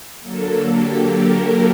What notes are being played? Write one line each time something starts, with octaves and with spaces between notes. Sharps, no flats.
D3 F#3 A#3 A4
G4
A#4